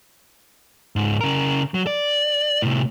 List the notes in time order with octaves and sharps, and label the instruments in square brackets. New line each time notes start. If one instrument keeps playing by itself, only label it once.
[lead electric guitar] C#2 G#2
C#3 A#4
F#3
D5
A2 C3